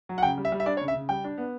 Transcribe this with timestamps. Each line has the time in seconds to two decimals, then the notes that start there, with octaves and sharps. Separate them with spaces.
0.09 F#3
0.18 F#5
0.23 C#3 G5
0.38 G3
0.45 E5
0.52 G3
0.60 E5
0.66 D4 D5
0.77 C#5
0.81 C#3
0.88 E5
0.94 C#3
1.09 G3 G5
1.24 D4
1.38 B3